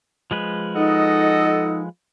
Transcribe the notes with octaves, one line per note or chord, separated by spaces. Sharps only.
F3 G#3 B4
D#4 A4 D#5 F#5